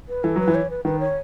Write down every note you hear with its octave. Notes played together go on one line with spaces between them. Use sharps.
B4
E3 A4
F#3 B4
E3
C#5
B4
D#3 B4
C#5